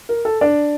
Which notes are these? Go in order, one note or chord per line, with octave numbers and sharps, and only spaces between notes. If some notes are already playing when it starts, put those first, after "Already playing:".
A#4
A4
D4 D5